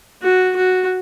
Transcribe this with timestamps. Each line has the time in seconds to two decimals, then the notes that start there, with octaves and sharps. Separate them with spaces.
0.22 F#4
0.56 F#4